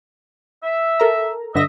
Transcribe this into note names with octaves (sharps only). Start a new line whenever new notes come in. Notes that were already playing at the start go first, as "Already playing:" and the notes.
E5
A4 A#4 A#5
G2 D3 D#5 E5 A#6